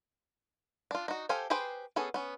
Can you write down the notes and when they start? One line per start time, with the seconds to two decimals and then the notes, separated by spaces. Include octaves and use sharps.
0.91 D4 F4
1.08 D#4 F#4
1.29 G4 A4 C5 F5 G#5
1.50 G4 G#4 B4 C5 G5
1.96 B3 C#4 G#4 A4
2.14 B3 C#4